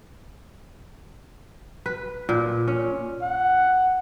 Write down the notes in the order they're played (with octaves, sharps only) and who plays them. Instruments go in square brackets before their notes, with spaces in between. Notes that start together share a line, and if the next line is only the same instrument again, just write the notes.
[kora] B4
A#2
C#4
[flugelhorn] F#5